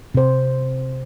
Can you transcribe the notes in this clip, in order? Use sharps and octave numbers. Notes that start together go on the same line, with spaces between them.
C3 C5